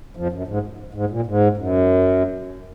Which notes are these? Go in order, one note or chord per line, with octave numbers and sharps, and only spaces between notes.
F2 F3
F#2
G#2
G#2
A#2
G#2
F#2